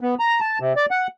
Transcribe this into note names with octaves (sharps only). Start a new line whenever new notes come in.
B3
A#5
A5
C3
D5
F#5